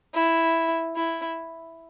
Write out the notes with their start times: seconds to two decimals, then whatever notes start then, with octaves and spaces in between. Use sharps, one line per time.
0.14 E4
0.96 E4